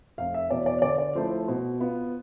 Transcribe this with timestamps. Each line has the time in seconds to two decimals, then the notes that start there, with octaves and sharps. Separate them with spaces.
0.18 F1 F5
0.34 E5
0.50 E2 B2 D5
0.66 D5
0.82 D3 D5
0.98 D5
1.15 F3 A3 E4 C5
1.31 C5
1.48 B2 C5
1.80 B3 F4